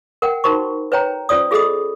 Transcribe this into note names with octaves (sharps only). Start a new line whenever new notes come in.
A#4 F#5 G5
D#4 F#4 A#4 C5 B5 C#6
B4 C#5 G5 A#5
C#4 F4 C5 D5 D#6
F4 G#4 A4 D#5 B5 D#6